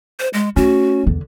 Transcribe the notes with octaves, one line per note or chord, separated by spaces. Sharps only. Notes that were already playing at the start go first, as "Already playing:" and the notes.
C5
G#3
A3 C#4 F#4
E2 D3